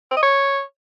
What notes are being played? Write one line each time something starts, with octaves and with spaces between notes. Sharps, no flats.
C4
D#5
C#5